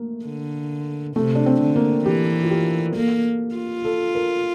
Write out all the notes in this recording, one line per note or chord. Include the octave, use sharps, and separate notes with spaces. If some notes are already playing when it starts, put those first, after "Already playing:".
Already playing: A3 A#3
D3
C3 A3
D4
C4
D3
A#3
E3 G4
F4
G4
A#3 A4
F4
A4
A#4